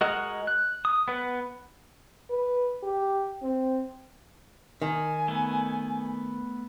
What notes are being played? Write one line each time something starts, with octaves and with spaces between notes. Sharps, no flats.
G#3 F#4 A#4 D#5 F#5
F#6
D#6
B3 B4
B4
G4
C4
D#3 G#5
A3 B3